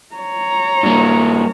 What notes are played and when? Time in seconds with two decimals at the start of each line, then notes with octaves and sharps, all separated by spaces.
0.15 C#5 A#5
0.83 G2 A#3